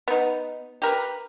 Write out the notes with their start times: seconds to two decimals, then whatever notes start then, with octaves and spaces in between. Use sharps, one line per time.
0.08 B3 D#4
0.82 G4 A#4 B4